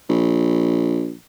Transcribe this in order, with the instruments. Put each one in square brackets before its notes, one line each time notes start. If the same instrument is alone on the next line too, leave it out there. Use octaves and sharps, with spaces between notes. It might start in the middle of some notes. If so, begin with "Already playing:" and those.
[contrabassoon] A#1